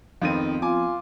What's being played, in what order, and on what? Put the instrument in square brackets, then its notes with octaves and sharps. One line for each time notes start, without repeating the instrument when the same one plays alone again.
[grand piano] F2 D#3 D#7 [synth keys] F3 B3 C4
[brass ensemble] F4 [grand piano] G#5 D6